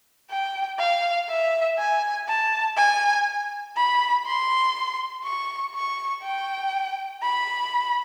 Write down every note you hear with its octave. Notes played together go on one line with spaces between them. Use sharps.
G5
F5
E5
G#5
A5
G#5
B5
C6
C#6
C#6
G5
B5